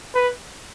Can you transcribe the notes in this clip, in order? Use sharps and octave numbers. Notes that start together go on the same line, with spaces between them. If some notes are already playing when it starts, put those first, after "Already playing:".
B4